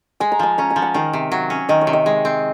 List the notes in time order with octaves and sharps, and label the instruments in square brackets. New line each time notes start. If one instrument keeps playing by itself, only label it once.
[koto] G#3 [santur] G#5
[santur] A#5
[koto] F3 [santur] G#5
[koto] C#4 [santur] A#5
[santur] G#5
[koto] F3
[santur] F#5
[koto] D#3 [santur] F5
[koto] C3
F#3
C#4
[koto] D#3 [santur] D#5
[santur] C#5
[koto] C3
[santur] D#5
[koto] G#3
C4